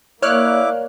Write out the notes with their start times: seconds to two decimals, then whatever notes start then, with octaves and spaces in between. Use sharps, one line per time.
0.22 A#3 E4 C#5 D5 F5 D6 F6 F#6